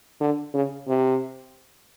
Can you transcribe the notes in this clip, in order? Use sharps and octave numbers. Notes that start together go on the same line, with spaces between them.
D3
C#3
C3